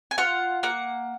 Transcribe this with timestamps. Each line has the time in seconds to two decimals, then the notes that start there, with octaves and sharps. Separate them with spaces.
0.11 G#5
0.18 F4 F#5
0.63 A#3 F#5